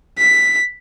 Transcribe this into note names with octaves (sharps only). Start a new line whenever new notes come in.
B6